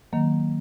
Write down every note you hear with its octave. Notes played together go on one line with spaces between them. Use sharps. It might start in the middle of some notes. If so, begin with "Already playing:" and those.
D#3 F#3 A#3